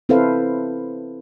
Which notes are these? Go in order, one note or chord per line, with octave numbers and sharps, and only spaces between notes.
C4 E4 A4 B4 C5 F5